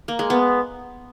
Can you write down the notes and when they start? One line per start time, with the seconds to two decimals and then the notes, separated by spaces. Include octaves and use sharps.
0.08 A#3
0.19 G#3
0.30 B3